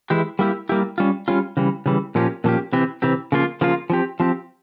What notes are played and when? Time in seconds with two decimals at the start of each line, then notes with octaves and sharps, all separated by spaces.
0.10 E3 G#3 E4 G4
0.39 G3 A#3 E4 G4
0.69 G3 A#3 E4 G4
0.98 G3 C#4 F4
1.28 G3 C#4 F4
1.57 C#3 E3 G3
1.86 C#3 E3 G3
2.15 A#2 F3 A#3 C#4 G4
2.44 A#2 F3 A#3 C#4 G4
2.72 C3 E3 C4 G4
3.02 C3 E3 C4 G4
3.32 C#3 F3 A#3 F4
3.61 C#3 F3 A#3 F4
3.90 F3 C4 G4
4.20 F3 C4 G4